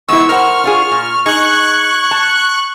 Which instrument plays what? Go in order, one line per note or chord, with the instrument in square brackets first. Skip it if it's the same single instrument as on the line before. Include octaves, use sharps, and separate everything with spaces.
[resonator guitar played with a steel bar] E3 G#3 B3 [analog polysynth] E4 E6 [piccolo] C#6
[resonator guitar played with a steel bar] A#4 C5 F#5 [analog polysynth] F6
[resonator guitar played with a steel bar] D4 F4 G#4
A#2
[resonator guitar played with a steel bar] D#4 G#4 [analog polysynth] C#6 F#6 [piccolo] G#6
[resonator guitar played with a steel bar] A5